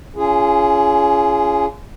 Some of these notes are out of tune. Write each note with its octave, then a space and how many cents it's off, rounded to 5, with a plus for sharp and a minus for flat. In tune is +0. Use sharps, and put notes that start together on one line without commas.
C#4 +25 F4 -30 G#4 +0